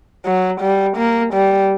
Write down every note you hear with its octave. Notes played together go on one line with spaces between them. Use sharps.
F#3
G3
A#3
G3